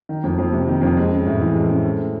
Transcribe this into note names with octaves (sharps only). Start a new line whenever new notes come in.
D#3
F2
F2
C3
D#3
F2
G#3
C#4
A2
E3
G#3
C#4
A3
C#4